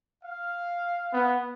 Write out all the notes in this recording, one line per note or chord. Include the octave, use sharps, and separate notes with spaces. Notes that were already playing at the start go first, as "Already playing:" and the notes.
F5
B3